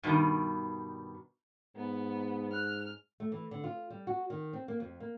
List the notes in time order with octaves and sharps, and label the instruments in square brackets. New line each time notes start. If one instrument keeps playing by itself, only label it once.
[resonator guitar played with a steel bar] G2 B2 D#3 G3
[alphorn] G#2 [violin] B3
[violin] F6 [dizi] F#6
[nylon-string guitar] A3
E3
D3
F4
G3
F#4
D#3
C4
A#3
F2
A#3